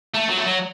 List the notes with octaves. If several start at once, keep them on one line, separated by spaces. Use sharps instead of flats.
A3
F#3
A3
F#3